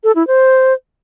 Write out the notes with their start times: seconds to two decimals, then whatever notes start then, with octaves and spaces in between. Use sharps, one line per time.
0.04 A4
0.16 E4
0.27 C5